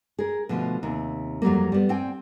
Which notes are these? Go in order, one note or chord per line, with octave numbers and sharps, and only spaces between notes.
G#4 A#4
B2 D3 F3 A3
D#2 C3
F2 F#3 G3 A#3
G3 B3
C4 G5 G#5